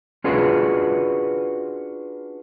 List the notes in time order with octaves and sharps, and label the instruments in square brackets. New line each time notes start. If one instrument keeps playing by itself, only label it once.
[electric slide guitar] C#4 D4 F4 F#4 G#4 B4